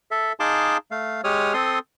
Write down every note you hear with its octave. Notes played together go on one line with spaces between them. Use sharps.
A4 E5
D#4 G#4 F5 A5 C6 D6
A3 F5
G#3 G4 C#5 D#6 F6
C4 A4 C6 D#6